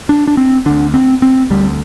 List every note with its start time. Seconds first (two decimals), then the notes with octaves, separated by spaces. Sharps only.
0.09 D4
0.27 D4
0.37 C4
0.66 D2 D3 D4
0.94 C4
1.22 C4
1.50 D2 D3 G3